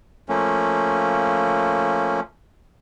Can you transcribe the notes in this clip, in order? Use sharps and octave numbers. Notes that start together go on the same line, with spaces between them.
F3 A3 A#3 C#4